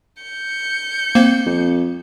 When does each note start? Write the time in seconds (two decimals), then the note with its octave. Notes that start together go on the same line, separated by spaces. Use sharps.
0.23 G6 C#7
1.15 A#3 C4 C5
1.46 F2